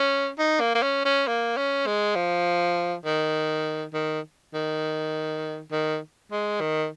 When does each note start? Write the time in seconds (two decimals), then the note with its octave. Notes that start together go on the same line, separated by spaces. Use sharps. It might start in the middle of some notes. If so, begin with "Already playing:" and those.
Already playing: C#4
0.38 D#4
0.60 A#3
0.74 A#3
0.82 C#4
1.05 C#4
1.27 A#3
1.57 C#4
1.86 G#3
2.15 F3
3.04 D#3
3.93 D#3
4.53 D#3
5.71 D#3
6.31 G#3
6.60 D#3